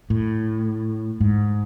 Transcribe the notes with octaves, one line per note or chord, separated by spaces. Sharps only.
A2
G#2